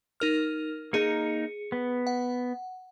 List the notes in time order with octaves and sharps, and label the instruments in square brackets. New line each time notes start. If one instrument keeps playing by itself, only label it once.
[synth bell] D#4 A#4 F6
[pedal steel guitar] A#3 D#4 A#4 [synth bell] G#4 C#7
[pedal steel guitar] B3
[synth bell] F#5